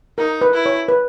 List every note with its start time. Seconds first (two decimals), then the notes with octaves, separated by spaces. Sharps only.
0.18 D#4 A#4
0.41 B4
0.53 E4
0.66 C#5
0.88 B4